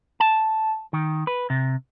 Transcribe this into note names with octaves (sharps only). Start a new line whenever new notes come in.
A5
D#3
B4
C3